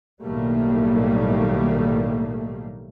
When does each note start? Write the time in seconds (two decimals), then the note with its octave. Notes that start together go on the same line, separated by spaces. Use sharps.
0.21 B1 A2 D#3 G3 A3 A#3